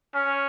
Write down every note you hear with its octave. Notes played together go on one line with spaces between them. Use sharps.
C#4